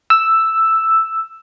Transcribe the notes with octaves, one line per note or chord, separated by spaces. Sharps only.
E6